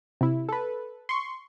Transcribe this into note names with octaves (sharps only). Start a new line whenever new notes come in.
C3 E4
A4 B4
C6 C#6